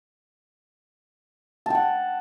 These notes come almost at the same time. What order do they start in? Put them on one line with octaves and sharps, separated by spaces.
A5 G5 F#5